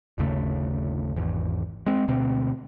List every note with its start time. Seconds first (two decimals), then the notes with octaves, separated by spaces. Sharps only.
0.18 G1 D#2 C#3 A3
1.16 G#1 E2
1.86 G#3 C4
2.08 D2 B2 C4